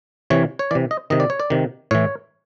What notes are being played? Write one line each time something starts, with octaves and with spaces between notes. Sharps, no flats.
C3 E3 C#5
C#5
C3 E3 D5
D#5
C3 D#3 D#5
D5
C#5
D5
C3 D#3
A2 E3 C#5